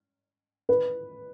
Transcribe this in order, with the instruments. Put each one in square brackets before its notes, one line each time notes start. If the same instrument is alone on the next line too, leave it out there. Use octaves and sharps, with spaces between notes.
[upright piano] B4